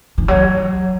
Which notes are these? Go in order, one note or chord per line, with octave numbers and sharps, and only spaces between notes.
E3
F#3